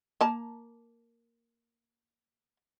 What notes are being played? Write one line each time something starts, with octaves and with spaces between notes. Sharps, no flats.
A#3 A5 A#5